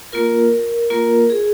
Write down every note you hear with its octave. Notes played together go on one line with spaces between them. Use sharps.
A#3 F4 A#4
A#3 F4 A#4
G#4